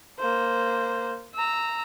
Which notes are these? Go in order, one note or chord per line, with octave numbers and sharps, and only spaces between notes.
A#3 C5
A#5 E6